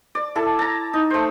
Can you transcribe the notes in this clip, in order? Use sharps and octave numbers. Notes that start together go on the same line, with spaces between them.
D5
E4 A4 A5
A5 A#5
D#4
A3 C5